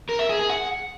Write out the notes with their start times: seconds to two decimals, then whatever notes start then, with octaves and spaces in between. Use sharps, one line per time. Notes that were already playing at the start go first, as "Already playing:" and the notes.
0.09 A#4
0.19 E5
0.29 G#4
0.39 G#4
0.50 F#5